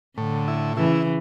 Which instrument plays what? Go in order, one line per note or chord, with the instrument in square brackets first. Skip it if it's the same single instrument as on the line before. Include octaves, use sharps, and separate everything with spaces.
[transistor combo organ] A2 [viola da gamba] D3
[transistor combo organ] E4
[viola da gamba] C#3 E3 [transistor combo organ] E4